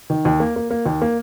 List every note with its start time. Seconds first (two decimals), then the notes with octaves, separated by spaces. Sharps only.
0.10 D#3
0.25 D#2
0.40 A#3
0.56 A#3
0.70 A#3
0.86 D#2
1.02 A#3